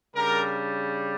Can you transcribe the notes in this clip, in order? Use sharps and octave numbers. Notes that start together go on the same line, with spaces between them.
C#3 G3 D4 A#4